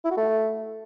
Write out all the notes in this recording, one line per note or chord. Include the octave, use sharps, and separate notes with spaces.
E4
F#4
A3